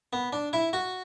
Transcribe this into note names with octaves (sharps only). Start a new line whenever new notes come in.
B3
D4
E4
F#4